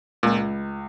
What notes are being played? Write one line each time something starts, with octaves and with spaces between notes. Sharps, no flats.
C#2 A#2